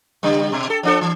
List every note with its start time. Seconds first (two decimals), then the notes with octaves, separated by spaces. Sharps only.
0.23 C#3 G3
0.52 B2
0.70 A4
0.83 F3 D4 A4
1.01 E3